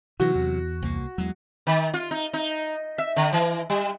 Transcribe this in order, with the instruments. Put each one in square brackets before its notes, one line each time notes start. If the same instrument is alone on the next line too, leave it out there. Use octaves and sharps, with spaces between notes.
[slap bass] C3 F#3 [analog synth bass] E3 [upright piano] F#4
[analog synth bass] E2
[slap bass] C2 A#3
[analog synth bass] E2 [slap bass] F#3 G#3
[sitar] D#3
F4
D#4
D#4
E5
D3
E3
G3